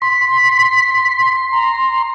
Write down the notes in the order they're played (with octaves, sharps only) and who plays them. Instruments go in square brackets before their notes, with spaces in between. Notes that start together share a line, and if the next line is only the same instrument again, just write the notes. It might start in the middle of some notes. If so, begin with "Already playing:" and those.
[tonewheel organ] C6 [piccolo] B6
[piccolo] A#5